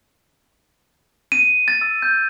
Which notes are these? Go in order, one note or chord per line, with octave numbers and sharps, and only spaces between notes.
D#7
A6
E6
G6